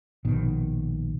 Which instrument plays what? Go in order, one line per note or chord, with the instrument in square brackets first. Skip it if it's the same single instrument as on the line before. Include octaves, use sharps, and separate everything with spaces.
[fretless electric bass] A#1 B2 D#3